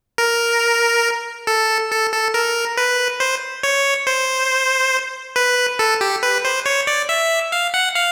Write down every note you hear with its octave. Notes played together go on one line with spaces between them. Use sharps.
A#4
A4
A4
A4
A#4
B4
C5
C#5
C5
B4
A4
G4
B4
C5
C#5
D5
E5
F5
F#5
F5